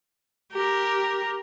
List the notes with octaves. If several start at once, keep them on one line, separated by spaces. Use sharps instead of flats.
G4 A#4